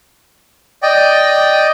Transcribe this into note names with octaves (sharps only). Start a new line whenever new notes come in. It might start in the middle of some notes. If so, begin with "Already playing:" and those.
D5 D#5 G5